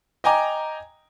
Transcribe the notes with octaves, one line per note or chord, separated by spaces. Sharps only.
D#5 G5 G#5 A#5 D6